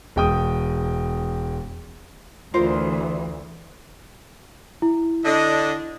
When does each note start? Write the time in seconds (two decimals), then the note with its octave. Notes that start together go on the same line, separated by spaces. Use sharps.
0.16 E1 G5 D#6
2.54 D2 E3 F4 A#4 C5
4.82 E4
5.25 D3 D4 D#5